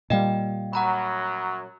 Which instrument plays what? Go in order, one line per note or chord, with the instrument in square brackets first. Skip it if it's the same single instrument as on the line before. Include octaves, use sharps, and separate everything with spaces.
[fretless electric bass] A#2 G3 [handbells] D#5 F5 G5
[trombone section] F#2 F#3 [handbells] F#5 A#5 B5